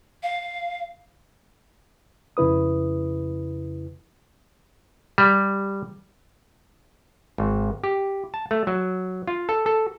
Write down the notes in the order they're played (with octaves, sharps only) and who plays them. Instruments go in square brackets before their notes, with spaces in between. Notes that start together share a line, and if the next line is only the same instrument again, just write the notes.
[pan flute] F5
[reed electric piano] F2 C#3 E4 B4 D#6
[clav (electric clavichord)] G3
G#1
G4
A5
A3
F#3
F4
A4
A4